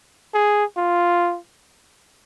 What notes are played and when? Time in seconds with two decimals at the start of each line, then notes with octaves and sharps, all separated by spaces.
0.34 G#4
0.77 F4